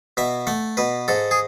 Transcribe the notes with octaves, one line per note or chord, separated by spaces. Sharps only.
B2 E5
A3 F#5
B2 B4
G#2 A4
G#4